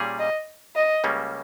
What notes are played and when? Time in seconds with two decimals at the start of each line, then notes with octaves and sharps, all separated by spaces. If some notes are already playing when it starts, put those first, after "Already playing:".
Already playing: A#2 G3 C#4 G#4
0.19 D#5
0.75 D#5
1.04 C#2 C#3 G3 A#3 C#4